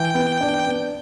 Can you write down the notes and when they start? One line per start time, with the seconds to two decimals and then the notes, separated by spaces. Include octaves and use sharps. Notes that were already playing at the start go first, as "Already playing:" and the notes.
Already playing: E3 G5
0.14 B3
0.41 D4
0.66 B3